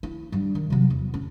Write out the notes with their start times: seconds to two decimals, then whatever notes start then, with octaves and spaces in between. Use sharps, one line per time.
0.03 E4
0.32 G2 G3
0.55 D#3
0.70 C3 F#3
0.90 E2
1.14 C#4